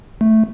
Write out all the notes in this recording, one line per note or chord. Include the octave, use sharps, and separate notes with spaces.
A3